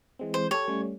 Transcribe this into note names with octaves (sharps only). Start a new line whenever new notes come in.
E3 G#3 C4
C5
G4 A4 C#5
G3 A3 C#4